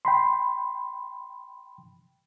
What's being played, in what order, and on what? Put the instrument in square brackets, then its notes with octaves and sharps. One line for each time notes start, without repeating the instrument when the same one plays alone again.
[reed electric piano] G5 B5 C6